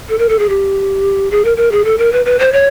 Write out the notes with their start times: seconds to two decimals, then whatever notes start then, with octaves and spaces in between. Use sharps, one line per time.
0.09 A4
0.19 A#4
0.29 A4
0.39 G#4
0.49 G4
1.31 G#4
1.44 A#4
1.57 A#4
1.72 G#4
1.85 A4
1.98 A#4
2.12 B4
2.26 B4
2.39 C5
2.53 C#5